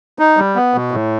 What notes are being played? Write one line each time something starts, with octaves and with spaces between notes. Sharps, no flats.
D#4
G3
B3
B2
A2